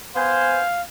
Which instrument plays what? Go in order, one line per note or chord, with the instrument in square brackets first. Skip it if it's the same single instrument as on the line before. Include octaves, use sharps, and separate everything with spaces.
[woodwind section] B3 C5 G#5 [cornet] F5